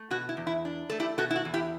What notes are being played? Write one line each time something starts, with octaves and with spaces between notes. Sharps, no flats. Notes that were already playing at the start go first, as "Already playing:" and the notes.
Already playing: A3
B2 F#4
E4
E2
E4
D4
A3 A4
E4 G4
B2 F#4 A4
E4
F#4
E2
E4 G4